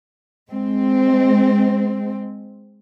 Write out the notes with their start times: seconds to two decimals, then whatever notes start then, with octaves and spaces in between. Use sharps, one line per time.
0.49 G#3 C4